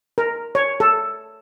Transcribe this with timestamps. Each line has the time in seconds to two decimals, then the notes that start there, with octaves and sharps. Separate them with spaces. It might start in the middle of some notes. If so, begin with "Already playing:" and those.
0.18 A#4
0.55 C#5
0.80 A4